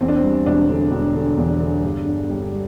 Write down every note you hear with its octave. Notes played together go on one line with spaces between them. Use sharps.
E2 C4
D4
C4
G3
E1 D4
D3
E1
D3
E2
D3
G2
G1
G3
G3